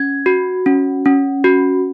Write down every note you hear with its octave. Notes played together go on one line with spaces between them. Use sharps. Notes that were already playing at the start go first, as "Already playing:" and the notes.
Already playing: C#4 G#6
F#4
C#4
C#4
F#4